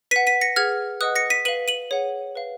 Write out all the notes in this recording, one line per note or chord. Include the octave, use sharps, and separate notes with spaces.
B4 F#5 B6 D#7
B6 D#7
A#6 C#7
G#4 B4 F#5 F6 G#6
B4 D#5 F#5 D#6 F#6
A#6 C#7
B6 D#7
B4 F5 D#7 F#7
D#7 F#7
G#4 C#5 F#5
B4 F5